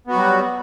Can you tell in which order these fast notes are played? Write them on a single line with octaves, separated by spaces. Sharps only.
B3 F#4 F#3 G3